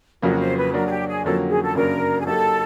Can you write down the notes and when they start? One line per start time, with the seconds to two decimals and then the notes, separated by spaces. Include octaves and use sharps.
0.22 F2 C#3 F#3 A#3 F#4
0.40 C5
0.57 B4
0.74 F#3 A#3 D4 F#4 A#4
0.86 G#4
0.91 G4
1.08 G#4
1.24 F2 D3 F#3 A#3 C#4 A4
1.49 G#4
1.63 A4
1.75 F#2 C#3 F#3 A#3 D4 A#4
2.20 G#4
2.25 F#3 A#3 D#4 G4 A4